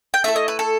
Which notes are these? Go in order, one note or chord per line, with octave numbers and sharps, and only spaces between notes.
G5
A3 E4 A4 E5
D#5
B4
A4